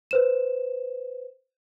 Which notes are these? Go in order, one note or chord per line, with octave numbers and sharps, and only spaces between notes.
B4 C5 E7